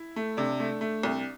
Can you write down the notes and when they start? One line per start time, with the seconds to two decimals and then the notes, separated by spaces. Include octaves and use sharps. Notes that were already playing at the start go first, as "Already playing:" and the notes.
Already playing: E4
0.16 A3
0.37 C3 D4
0.60 A3
0.81 A3
1.03 C2